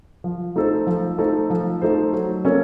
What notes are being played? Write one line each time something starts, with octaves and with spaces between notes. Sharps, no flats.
F3
A3 D#4 A4 C5
F3
A3 D#4 A4 C5
F3
A3 D#4 A4 C5
F#3
A#3 C#4 A4 C#5